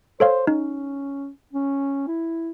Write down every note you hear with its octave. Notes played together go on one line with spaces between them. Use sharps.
A4 C5 C#5 F5
C#4 D#4
C#4
E4